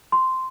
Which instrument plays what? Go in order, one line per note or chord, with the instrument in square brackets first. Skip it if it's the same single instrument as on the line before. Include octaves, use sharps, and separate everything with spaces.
[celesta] C6